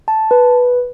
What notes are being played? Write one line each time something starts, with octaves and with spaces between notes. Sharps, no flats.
A5
B4